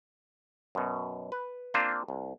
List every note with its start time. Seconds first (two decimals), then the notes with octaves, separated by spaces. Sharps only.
0.75 F#2 B2
1.32 B4
1.74 A#3 C4 D4 F4 C5
2.08 C2